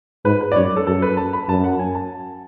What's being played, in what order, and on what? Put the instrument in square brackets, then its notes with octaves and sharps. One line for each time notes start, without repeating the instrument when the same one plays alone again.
[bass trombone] G#2 [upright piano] B4
[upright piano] B4
D5
[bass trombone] F#2 [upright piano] C#5
[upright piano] A4
[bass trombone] F#2 [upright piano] A4
[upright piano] B4
A5
B5
[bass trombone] F#2 [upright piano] A5
[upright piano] F#5
G#5
A5